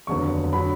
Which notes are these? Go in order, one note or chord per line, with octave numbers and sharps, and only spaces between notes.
F1 D#2 D3 F#3 B3 C#6
D3 F#3 B5